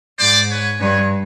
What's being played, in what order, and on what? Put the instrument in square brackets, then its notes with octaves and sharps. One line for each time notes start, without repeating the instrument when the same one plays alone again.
[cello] G#2 [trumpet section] C5 D5
[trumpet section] B4 C#5
[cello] G2 [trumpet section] B4 C#5